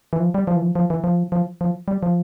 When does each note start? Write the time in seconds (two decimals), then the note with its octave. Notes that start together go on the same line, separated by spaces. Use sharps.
0.13 E3
0.20 F3
0.34 G3
0.47 F3
0.56 E3
0.62 F3
0.75 F3
0.90 E3
1.04 F3
1.32 F3
1.61 F3
1.88 G3
2.03 F3